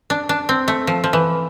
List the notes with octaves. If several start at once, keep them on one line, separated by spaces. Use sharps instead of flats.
D4
D4
C4
A3
F3
F3
E3